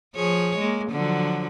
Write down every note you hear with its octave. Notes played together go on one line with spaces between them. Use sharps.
F3 G#4 C#5
G#3 A#3
D3 F3 F#3